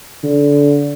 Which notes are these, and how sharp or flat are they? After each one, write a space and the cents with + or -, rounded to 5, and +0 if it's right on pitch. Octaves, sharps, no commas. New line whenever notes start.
D3 -25